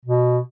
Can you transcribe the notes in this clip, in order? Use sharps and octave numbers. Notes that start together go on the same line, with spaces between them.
B2